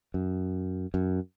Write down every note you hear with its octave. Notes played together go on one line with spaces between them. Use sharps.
F#2
F#2